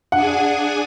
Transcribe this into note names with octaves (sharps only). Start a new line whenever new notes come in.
D4 G#4 F#5 G#5